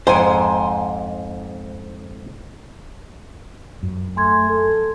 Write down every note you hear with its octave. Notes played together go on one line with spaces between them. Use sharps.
F2 G#2 C5 G#5
F#2
A3 G#5 C6 G#6
A4